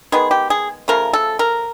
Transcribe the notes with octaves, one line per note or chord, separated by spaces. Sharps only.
D#3 G#3 B3 G#4
G4
G#4
C#3 F3 A3 A#4
A4
A#4